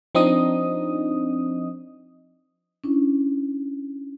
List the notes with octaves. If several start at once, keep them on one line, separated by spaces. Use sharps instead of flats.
F3 C4 D4 D#4 D#5 D#6
C#4 D4 E4